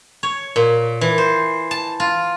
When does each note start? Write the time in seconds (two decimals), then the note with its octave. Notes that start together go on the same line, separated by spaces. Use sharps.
0.23 C#5
0.56 A#2
1.01 E3
1.18 C5
1.71 A5
2.00 F4